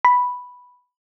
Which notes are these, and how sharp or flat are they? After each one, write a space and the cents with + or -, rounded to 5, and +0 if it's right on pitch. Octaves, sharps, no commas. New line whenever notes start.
B5 +0